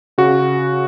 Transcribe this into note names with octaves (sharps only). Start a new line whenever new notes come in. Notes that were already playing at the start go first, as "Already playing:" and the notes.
C#3 F#4